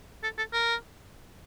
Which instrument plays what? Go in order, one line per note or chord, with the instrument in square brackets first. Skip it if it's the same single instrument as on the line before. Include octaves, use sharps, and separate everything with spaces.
[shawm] A4
A4
A#4